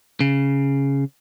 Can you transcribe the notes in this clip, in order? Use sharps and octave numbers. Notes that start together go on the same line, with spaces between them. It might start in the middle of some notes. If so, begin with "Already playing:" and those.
C#3